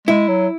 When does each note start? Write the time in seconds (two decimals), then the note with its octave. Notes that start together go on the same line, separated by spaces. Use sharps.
0.07 G#3 E4
0.29 F#3